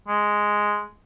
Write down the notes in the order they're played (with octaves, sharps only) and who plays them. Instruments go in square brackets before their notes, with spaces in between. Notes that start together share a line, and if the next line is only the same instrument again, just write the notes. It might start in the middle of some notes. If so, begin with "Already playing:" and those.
[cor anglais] G#3